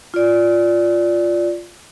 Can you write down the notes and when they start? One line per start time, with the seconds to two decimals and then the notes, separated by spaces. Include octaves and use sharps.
0.14 F4 D5